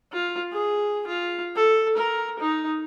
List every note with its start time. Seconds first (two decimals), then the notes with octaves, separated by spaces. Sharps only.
0.12 F4
0.52 G#4
1.07 F4
1.56 A4
1.97 A#4
2.39 D#4